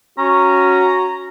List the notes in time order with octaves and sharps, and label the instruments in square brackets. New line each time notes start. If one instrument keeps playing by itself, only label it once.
[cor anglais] C#4 [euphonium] F#4 [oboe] A#5